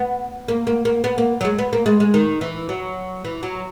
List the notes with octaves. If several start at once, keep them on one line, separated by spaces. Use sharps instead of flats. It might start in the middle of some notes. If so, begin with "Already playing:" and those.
Already playing: B3
A#3
A#3
A#3
B3
A#3
F#3
G#3
B3
A#3
G#3
G#3
D#3
E3
F#3
E3
F#3